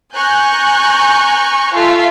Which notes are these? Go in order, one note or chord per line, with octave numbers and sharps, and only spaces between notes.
G#5 A#5 C#6 F#6 G6
F4 A4 E5